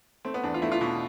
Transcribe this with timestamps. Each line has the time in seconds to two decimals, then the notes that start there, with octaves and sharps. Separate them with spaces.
0.25 A3 C4
0.34 B3
0.43 E2 D4
0.54 F4
0.62 A3 E4
0.72 F4
0.81 B2 E4